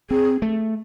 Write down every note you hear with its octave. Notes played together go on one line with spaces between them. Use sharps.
C4 G#4
A3